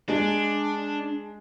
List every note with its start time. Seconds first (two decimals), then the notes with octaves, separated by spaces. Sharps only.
0.09 G#3 D4